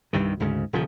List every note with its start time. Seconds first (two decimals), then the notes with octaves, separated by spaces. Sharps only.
0.13 C2 G2 C3 D#3
0.40 D2 G#2 C#3
0.73 D#1 C#3 F3